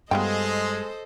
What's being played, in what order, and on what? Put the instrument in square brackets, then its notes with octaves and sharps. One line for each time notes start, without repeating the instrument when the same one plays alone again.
[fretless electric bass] G2 [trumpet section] G#3 [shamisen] B3 F4 G5 [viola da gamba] A4 C5 D#5